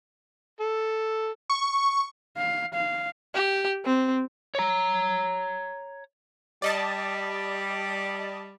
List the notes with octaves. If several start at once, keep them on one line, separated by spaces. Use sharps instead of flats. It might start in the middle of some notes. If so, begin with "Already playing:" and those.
A4
C#6
F5
F5
G4
C4
C#5 A#5
G3 D5 D#5 A5